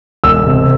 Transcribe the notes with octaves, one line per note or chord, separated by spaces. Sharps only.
E1 E6
C3